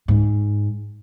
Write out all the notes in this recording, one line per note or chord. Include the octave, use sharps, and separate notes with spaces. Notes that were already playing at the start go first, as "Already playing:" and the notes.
G#2